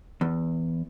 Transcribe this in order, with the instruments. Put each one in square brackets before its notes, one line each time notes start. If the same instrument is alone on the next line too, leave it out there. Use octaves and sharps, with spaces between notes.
[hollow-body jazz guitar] E2